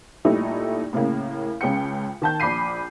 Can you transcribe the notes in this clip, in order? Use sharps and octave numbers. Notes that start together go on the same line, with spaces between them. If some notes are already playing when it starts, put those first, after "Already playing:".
A#2 G3 A3 D#4 E4
A2 C#3 A#3
C#2 C#3 G5 C#7
D#3 A5 G6
A#1 B5 D6 C7 D#7